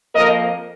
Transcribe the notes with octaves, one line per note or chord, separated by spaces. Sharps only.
F2 F3 A#3 A#4 D#5